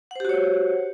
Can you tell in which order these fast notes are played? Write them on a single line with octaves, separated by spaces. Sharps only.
F#5 C5 G4 F#4 C#5